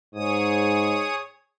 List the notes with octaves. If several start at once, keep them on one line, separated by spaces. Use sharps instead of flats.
G#2 G#4 C#5 D#6